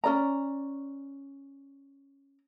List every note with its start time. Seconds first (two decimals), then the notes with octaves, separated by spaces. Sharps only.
0.04 C#4 G#4 D5 A#5